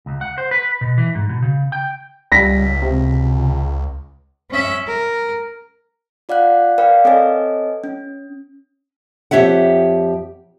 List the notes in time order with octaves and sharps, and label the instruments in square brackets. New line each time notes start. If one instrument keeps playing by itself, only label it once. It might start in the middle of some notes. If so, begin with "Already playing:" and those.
[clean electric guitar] C#2
F#5
C5
B4
B2
E3
G#2
B2
C#3
G5
[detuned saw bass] C#2 [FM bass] G3 [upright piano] A#6 B6
[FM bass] C3
[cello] C#4 E5
A#4
[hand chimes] F4 D5 F5 F#5 F#6
A#4 B4 D5 F5 G5
C4 A4 B4 C#5 D#5 G#5
C#4
[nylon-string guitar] F2 E3 G4 C#5 E5 F#5